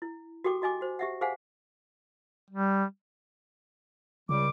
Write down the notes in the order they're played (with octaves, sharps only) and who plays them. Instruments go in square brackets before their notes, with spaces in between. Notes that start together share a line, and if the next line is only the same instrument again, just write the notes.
[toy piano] E4
F#4 G4 A4 G5 D6
F#4 D#5 G#5 D6
F#4 C5
G4 E5 F#5
G#4 C5 F5 F#5 G#5
[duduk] G3
[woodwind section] C#2 G3 [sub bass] C#3 [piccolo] D6